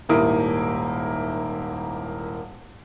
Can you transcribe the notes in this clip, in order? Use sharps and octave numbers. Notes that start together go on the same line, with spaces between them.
D#1 G#2 A#3 E4 D#6